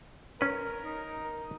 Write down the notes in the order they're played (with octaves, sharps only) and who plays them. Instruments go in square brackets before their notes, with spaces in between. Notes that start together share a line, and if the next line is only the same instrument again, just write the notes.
[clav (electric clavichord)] C#4 B4 [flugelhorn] A#4
[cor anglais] D#4